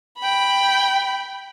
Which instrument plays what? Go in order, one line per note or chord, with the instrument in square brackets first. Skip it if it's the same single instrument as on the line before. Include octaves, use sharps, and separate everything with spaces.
[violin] G5 B5